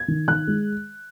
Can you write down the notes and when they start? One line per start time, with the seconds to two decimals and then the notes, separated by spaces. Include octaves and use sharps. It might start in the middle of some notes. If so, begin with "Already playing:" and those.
Already playing: G#6
0.08 D#3
0.28 D#3 F#6
0.47 G#3